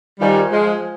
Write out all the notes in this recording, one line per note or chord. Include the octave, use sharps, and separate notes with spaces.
D#3 G3 F4 C5 F5 G#5
F3 G#3